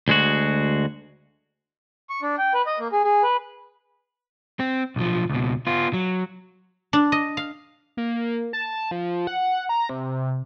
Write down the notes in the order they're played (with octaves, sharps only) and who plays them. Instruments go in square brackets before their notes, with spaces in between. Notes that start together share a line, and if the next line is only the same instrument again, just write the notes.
[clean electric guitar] D2 G#3 F#4
[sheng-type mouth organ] C#6
D4
G5
B4
D#5
A#3
G#4
G#4
B4
[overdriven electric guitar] C4
B1 F3
C#2 B2
B3 F4
F#3
[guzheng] D4
D#5
F5
[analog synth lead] A#3
A5
F3
F#5
A#5
C3